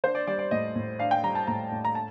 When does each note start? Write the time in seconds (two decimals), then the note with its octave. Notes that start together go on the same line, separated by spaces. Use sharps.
0.04 D4 C5
0.15 D5
0.27 G3 D5
0.39 D5
0.51 A2 D#5
0.75 A2
0.99 D4 F5
1.11 G5
1.23 G3 A#5
1.35 A5
1.47 A2 A#5
1.71 A2
1.85 A#5
1.95 A5